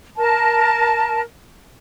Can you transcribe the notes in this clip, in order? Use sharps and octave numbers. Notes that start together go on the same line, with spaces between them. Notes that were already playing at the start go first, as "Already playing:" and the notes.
A#4 A5